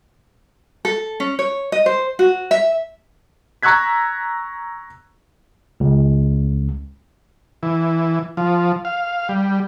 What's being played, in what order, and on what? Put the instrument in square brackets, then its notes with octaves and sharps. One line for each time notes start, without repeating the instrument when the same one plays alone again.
[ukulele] A4
C#4
C#5
D#5
C5
F#4
E5
[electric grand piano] A#5 C#6 E6 F#6 G#6 B6
[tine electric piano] C#2
[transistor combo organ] E3
F3
F5
G3